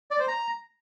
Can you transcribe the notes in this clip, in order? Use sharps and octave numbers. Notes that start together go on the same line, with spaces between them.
D5
C5
A#5